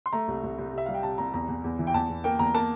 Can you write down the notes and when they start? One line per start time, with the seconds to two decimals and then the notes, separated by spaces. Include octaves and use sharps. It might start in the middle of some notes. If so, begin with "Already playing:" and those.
0.06 C6
0.13 A3 A#5
0.28 C2
0.44 C2
0.58 C2
0.73 C3 E5
0.86 G3 F5
0.94 G5
1.03 C3 A5
1.18 C2 A#5
1.34 E2 A#5
1.48 E2
1.64 E2
1.79 E3
1.87 G5
1.94 E2 A5
2.09 E2
2.24 A#3 G5
2.39 E2 A#5
2.54 A#3 A5